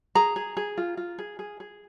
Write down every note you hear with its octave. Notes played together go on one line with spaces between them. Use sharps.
G#4 A#5
G#4
G#4
F4
F4
G#4
G#4
G#4